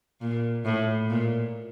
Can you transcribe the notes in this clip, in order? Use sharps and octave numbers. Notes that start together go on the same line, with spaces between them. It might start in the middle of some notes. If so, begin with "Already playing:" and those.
A#2
A2
A#2